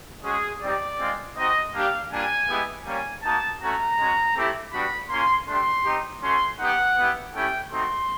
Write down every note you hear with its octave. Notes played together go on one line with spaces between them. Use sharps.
G#3 C#4 F#4 G#4
G3 C4 D#4 G4 D5
G#3 C4 F4
C4 D#4 F#4 D#5
G3 A#3 D4 G4 F5
G3 A#3 D4 F4 G#5
G#3 B3 E4 G4
G3 A#3 C#4 G#5
A#3 D#4 F#4 A5
A3 C#4 F#4 A#5
G#3 C#4 F#4
A3 C4 E4 G4
G3 B3 D4 F#4 B5
A#3 C#4 F4 C6
A3 D4 G4 C6
C4 D#4 G4
A3 C#4 F#4 C6
B3 D#4 G4 F#5
B3 E4 G4
A3 C#4 E4 G4 G5
A3 C4 D#4 F#4 C6